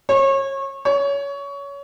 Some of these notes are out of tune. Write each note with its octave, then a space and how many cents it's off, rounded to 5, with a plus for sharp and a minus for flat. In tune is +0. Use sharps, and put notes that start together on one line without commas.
C#5 -30
C#5 +20